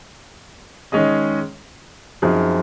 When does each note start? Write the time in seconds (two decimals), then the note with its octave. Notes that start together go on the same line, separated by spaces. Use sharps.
0.92 D#3 G#3 C#4 G#4 D#5
2.22 F#2 F3 C4 D#4 G#4